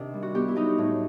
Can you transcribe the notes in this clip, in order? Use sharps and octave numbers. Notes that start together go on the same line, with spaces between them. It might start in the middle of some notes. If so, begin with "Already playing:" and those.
Already playing: C3 D#3 D4
G3
F#4
B3 G4
E4
F#3 D#4
A2